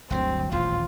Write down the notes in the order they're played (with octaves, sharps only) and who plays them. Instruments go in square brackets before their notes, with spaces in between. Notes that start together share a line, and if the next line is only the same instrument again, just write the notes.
[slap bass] G1 D2 F#3 [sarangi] C4
[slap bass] D#1 A1 E2 [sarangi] F4